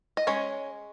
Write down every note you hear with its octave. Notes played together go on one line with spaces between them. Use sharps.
D#5
G#3 C#4 C#5